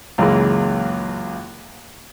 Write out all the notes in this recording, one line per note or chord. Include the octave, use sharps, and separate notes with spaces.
C#2 F#2 E3 G#3 A#3